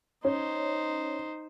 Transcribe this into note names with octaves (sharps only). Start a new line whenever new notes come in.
C#4 D#4 C5